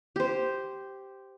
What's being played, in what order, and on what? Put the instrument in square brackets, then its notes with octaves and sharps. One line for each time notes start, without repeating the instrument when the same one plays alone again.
[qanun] G4 C5